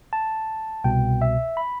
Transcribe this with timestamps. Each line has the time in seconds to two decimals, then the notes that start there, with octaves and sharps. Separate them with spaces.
0.13 A5
0.84 C2 B2 G5
1.22 E5
1.57 B5